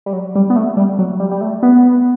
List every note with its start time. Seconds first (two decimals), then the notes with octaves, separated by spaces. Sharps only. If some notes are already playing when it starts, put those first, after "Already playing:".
0.06 G3
0.13 F#3
0.35 G3
0.50 B3
0.56 A3
0.77 G3
0.99 F#3
1.20 G3
1.31 G3
1.41 A3
1.63 B3